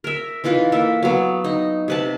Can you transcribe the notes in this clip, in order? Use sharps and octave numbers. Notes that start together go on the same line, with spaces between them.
A#4 E5
E3 D#4 F4 B4
A#3 A4 E5
F#3 B3
D#4
C3 B4 A5